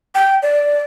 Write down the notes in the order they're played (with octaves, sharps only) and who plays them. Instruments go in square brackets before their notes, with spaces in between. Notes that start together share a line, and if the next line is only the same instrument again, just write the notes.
[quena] G5
D5